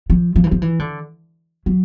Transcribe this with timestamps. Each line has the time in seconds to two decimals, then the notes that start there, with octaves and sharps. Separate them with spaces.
0.10 F3
0.36 F3
0.44 E3
0.51 F3
0.62 E3
0.79 D3
1.66 F#3